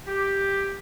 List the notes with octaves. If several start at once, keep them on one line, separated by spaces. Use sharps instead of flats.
G4